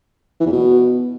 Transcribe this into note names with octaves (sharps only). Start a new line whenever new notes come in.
E3
E2
B2